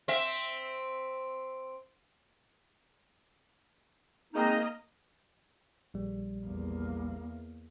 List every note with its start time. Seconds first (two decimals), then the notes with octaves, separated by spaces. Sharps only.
0.08 C4 E5
4.34 G#3 A#3 C4 D#4 D#5
5.94 A#1 G3
6.46 E2 A#3